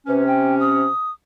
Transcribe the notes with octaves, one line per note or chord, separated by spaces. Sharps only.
C3 C#4 B4
G5
D#6